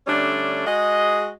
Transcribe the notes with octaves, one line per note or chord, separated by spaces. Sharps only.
D3 G3 A3 C#4 D4
G#3 F#4 G#4 D#5